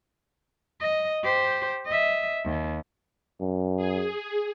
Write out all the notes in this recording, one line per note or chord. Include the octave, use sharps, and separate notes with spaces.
D#5
G4 C5
D#5 E5
D#2
F#2
G#4